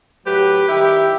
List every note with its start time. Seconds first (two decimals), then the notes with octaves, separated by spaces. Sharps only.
0.24 A2 F#3 A3 G4 B4
0.67 D#3 G3 E4 G4